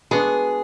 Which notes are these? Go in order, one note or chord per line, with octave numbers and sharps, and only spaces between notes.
G#3 B3 D4 F#4 G#4